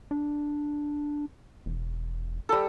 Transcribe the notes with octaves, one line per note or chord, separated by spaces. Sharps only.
D4
E1
G3 A4